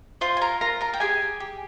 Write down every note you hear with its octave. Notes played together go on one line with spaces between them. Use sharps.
F4 C5 C6
G#5
A#4 A#5
F4 A#4 A#5
A#4 A#5
G5
G4 G#4 G#5
G4